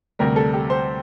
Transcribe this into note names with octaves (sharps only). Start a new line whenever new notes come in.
D2 C3 G3 A#4
A4
G4
C5